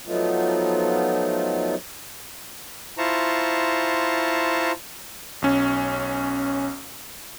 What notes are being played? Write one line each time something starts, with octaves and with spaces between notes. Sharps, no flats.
F3 F#3 A3 B3 D#4 F4
E4 F4 C5 A5 A#5 C#6
B1 C#4